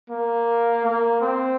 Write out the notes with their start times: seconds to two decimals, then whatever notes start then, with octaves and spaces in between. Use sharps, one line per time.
0.10 A#3
0.85 A#3
1.21 C4